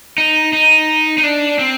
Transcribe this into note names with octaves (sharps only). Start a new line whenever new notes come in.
D#4
D#4
D#4
D4
C4